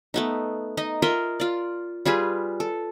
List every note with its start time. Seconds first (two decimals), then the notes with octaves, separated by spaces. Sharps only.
0.14 A3 B3 D#4
0.77 D#4 D#5
1.02 F4 A#4 D#5 E5
1.40 F4 D5
2.05 G3 F4 G#4 B4
2.60 A4